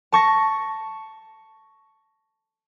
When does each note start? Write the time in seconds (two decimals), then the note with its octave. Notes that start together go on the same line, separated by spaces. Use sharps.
0.12 A5 C#6 A#6